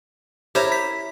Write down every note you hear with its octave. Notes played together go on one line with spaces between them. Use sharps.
E4 G4 A#4 C5 C#5
B6